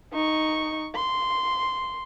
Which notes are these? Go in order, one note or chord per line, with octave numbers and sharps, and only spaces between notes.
D#4 C#6
C6